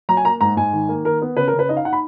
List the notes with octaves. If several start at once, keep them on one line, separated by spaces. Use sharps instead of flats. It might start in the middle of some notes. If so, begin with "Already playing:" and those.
F#3 A#5
G#5
A#3 A#5
G#2 A#5
G#2 G#5
D#3
A#3
D#3 A#4
B3
C#3 B4
A#4
C#3
B4
D#4 D#5
F5
D#4 F#5
B5